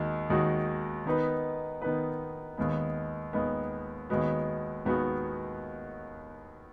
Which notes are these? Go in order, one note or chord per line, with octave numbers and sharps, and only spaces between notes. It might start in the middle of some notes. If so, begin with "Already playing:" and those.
Already playing: D#2 D#3 G#3 D#4 F#4
D#2 D#3 G#3 D#4 F#4
D#3 B3 D#4 B4
D#3 B3 D#4 B4
D#2 D#3 G#3 B3
D#2 D#3 G#3 B3
D#2 D#3 G#3 B3 F#4
D#2 D#3 G#3 B3 F#4